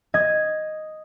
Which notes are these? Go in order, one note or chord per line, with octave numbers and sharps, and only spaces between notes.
D#5 G#6